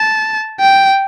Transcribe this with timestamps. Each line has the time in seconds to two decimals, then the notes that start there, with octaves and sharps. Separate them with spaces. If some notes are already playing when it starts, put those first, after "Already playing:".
Already playing: A5
0.60 G5